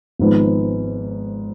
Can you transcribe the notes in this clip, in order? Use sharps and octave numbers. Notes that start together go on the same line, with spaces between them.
G#1 G#2 F3 G#3 B3